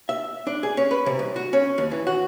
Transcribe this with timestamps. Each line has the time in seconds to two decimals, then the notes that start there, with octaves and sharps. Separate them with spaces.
0.09 E5
0.47 D4
0.63 G#4
0.77 C#4
0.91 B4
1.06 C3
1.19 C2
1.36 F#4
1.53 C#4
1.78 D#2
1.91 E3
2.07 F#4